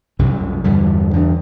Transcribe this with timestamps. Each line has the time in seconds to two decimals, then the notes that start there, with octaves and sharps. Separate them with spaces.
0.19 C2 F#2 C3
0.64 E2 G2 D3 G3
1.13 E2 D4